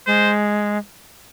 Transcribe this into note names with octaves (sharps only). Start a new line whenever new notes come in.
G#3 C5